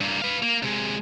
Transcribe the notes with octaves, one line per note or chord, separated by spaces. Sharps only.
G2 A#3
B4 F5
A#3
C3 G#3